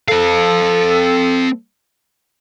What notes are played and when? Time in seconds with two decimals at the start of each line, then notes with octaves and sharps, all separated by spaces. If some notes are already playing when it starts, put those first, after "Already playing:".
0.08 C4 A4 F5